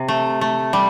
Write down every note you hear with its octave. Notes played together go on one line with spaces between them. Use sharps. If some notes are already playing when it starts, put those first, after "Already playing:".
Already playing: C3
A3
A3
G3